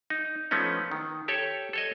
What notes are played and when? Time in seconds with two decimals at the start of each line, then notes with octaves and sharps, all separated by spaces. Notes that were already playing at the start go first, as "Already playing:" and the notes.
0.10 D#4
0.51 F3 A3 B3 C#4 D#4
0.91 D#3
1.28 G4 A4 C#5
1.73 A4 C#5 D#5